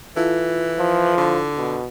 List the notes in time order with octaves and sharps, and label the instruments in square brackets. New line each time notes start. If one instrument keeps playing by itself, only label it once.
[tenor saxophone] E3 [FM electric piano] E4 F4 A4
[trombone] F3
[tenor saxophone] D3
[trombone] B2